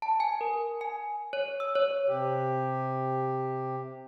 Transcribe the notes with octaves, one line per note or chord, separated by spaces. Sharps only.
A5
G#5
A#4
G#5
C#5
E6
C#5
C3 G4